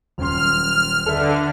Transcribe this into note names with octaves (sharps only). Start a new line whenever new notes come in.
D#1 F#2 C6 F6
D3 A4 B4 E5